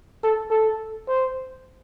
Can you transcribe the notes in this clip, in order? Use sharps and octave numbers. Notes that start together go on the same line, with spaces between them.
A4
A4
C5